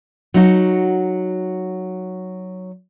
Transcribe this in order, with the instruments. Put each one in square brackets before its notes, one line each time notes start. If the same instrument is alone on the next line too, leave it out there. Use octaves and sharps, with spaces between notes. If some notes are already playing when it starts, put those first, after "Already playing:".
[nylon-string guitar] F#3 D#4 F#4